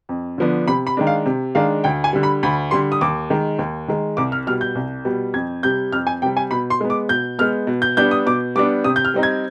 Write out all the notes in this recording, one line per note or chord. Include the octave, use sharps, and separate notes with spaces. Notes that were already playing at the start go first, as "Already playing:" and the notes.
F2
D3 F3 B3 D4
C3 B5
B5
D#3 G#3 D4
F5
C3
D#3 G#3 D4 F5
D2 G5
G#5
D3 G3
B5
D2 B5
D3 G3 C6
D#6
D#2 D6
D#3 G#3
D#2
D#3 G#3
C2 D6
F6
B2 G3 F6
G6
C2
B2 G3
F2 G#6
C3 G3 G6
F2 F6
G#5
C3 G3 G5
G#5
B2 B5
C6
G#3 B3
D6
B2 G6
G#3 B3 F6
B2
G6
G3 B3 D4 G6
D#6
B2 D6
G3 B3 D4 D6
C3 D#6
G6
F6
G3 C4 D#4
G#6